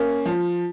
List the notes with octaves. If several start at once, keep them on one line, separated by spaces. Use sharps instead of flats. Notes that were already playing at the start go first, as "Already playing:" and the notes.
Already playing: A#3 C#4
F3